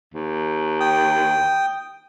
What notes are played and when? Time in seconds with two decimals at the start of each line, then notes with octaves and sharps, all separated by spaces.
0.14 D#2
0.80 G5 D#6